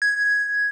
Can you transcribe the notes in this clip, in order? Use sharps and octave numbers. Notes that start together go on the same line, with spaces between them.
G#6